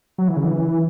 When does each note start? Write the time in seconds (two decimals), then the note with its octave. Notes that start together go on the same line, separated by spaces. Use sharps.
0.18 F#3
0.28 E3
0.36 C#3
0.45 E3